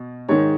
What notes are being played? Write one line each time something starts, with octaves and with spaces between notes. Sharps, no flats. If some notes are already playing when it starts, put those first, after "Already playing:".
Already playing: B2
G#2 D#3 G#3 C#5